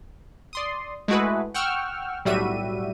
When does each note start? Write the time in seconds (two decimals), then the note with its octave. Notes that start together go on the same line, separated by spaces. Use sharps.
0.53 D5 C6 D#6
1.08 G#3 A3 E4 F#4 G#4 B4
1.54 F#5 G5 C#6 E6 F6
2.25 B1 A2 G3 F#4 E5 D#7